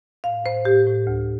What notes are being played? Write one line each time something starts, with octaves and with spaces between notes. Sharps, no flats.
A2 F5
A2 C5
A2 G4
A2
D2